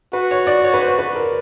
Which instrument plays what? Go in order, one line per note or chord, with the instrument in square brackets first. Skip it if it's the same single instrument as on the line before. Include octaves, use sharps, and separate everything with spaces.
[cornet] F#4 [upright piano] B4
[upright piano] C#5
D5
C#5
B4
C5
B4
A#4